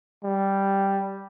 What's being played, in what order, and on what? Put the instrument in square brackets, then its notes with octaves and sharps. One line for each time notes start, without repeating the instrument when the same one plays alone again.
[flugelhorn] G3